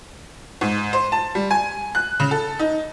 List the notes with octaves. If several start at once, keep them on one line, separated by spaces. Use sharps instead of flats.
G#2
C5
A5
G3
G#5
F#6
C#3
A4
D#4